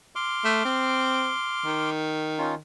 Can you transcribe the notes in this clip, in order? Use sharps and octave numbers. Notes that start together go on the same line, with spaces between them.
C6 D6 F6
A3
C4
D#3
C#4 D#4 F4